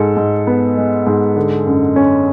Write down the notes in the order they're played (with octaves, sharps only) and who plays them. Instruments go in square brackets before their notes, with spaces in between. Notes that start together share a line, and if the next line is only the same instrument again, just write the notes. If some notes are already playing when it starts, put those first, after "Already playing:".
Already playing: [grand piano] G#2 G#3 A4
G#2
B3
G#3
G#2
D3
F#2
C#4